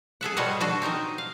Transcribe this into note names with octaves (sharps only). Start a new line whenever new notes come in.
G#4 A4 E5 F#5
B2 G3 F4 C#5 D#5 F#5
D4 F#4 A4
C4 D#4 A#4 D#5
F5